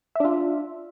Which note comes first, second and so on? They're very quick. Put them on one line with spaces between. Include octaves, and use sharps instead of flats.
E5 D4 F4